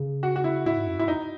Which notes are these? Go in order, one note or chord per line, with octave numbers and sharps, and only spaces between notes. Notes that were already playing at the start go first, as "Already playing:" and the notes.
Already playing: C#3
F#4
F#4
E4
A2 E4
G#2
F#2
G#2 E4
F#2 D#4